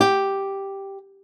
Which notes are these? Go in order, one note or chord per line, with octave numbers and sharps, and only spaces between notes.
G4